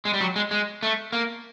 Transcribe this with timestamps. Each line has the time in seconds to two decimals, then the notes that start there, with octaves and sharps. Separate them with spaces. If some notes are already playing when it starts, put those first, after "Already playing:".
0.05 G#3
0.14 G3
0.21 F#3
0.36 G#3
0.51 G#3
0.83 A3
1.13 A#3